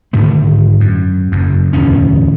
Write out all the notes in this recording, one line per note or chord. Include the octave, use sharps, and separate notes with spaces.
G#2 D3 D#3 A3
F#2
F#1 F#2
D1 E2 B2 C#4